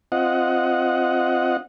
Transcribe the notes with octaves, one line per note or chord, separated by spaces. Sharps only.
C4 F4 D#5 F#5